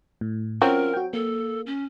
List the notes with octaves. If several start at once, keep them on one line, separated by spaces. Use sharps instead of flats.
A2
F#3 C4 C#4 F4 A#4
F#4 G5
A#3 A4
C#4